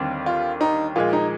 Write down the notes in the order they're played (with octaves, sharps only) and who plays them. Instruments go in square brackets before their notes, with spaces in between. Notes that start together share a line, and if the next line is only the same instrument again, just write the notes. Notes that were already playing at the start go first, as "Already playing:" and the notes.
Already playing: [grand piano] D#2 D3 G3 C4
[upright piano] F4
D#4
[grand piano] A#2 F3 G#3 [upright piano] F4
[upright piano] D#4